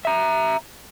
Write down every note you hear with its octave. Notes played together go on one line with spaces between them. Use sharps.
E5 A#5